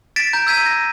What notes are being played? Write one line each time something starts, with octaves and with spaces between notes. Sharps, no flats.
A6 B6 D7 E7
A#5 G6
E6 G6 G#6 B6 D#7
A#6